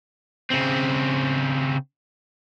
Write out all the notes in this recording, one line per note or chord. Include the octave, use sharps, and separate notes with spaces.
C#3 C4